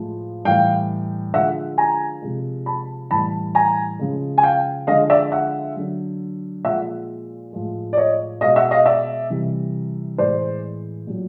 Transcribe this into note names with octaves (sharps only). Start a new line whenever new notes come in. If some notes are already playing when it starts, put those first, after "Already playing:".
Already playing: A2 F3 G#3
A2 E3 G3 F5 G5
D3 F3 G#3 E5 F#5
G#5 A#5
C3 F3 G#3
A5 B5
A2 E3 G3 A5 B5
G#5 A#5
C#3 F3 G#3
G#5
F5 G5
D3 F3 G#3 D#5 F5
D5 E5
E5 F#5
D3 F#3
A#2 F3 G#3 E5 F#5
A2 F3 G#3
D5
C#5 D#5
B2 G#3 D#5 F5
E5 F#5
D#5 F5
D5 E5
C3 E3 G3
A2 E3 G#3 C5 D5
A#2 F#3